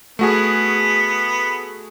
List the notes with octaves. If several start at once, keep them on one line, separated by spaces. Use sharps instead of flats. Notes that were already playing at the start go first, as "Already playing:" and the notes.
A3 B3 F#4 G#4